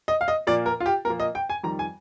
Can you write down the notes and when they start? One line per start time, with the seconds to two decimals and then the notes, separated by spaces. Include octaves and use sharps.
0.08 D#5
0.21 F5
0.28 D#5
0.47 A#2 F3 A#3 D5
0.66 A#4
0.80 F4
0.86 G4
1.05 A#2 A#4
1.08 F3 A#3
1.20 D#5
1.35 G5
1.50 G#5
1.63 F2 D#3 G3 A#5
1.79 G#5